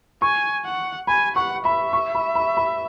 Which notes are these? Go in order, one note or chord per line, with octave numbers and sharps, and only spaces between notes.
G#5 C#6
F#5
G#5 B5
F#5 C#6
E5 B5
C#6
B5
B5
B5